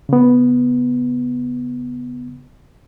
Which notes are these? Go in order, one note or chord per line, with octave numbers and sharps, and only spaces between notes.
C#3 B3